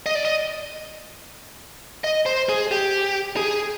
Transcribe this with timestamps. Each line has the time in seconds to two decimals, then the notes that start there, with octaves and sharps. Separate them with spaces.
0.06 D#5
0.15 D5
0.25 D#5
2.04 D#5
2.26 C5
2.49 G#4
2.71 G4
3.37 G#4